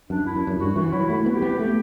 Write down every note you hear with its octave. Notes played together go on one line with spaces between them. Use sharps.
F#2 D4
E4
F#2
F#2
G2 F#4
E3 F#4
F#3 E4
A3 E4
B3
G4
B3
A3 G4